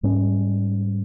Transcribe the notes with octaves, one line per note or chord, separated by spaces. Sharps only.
G#2 G3 C#4